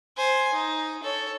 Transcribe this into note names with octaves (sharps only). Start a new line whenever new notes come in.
C5 G#5
D#4
A4 C#5